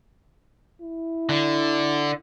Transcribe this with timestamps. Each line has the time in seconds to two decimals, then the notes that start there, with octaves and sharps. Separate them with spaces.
0.81 E4
1.29 D3